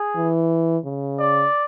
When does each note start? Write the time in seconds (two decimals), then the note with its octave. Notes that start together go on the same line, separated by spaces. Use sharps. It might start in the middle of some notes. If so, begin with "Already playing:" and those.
Already playing: G#4
0.16 E3
0.85 C#3
1.19 D5